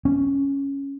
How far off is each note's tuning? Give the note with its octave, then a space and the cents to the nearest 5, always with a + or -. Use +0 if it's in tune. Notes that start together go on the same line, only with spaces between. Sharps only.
C#4 +0